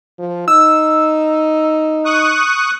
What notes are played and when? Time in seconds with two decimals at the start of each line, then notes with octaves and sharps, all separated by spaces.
0.19 F3
0.48 D#4 E6
2.05 C#6 D#6 F#6